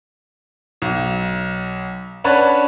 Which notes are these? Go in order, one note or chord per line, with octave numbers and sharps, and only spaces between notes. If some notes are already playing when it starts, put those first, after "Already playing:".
B1
C#4 D4 B4 C#5 F#5 A5